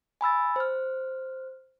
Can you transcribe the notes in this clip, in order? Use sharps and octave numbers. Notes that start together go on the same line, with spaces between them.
G#5 B5 E6 A6
C5 F6